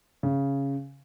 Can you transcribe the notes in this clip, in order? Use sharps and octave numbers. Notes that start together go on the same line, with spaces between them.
C#3